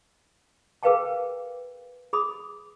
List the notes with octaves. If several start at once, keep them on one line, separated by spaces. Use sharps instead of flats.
G#4 A#4 B4 F5 G5 A5
G#4 B5 D#6